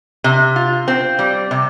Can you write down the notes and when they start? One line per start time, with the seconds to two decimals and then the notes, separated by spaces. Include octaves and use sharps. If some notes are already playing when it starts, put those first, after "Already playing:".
0.24 C3
0.56 F4
0.88 C4
1.19 G3
1.51 C3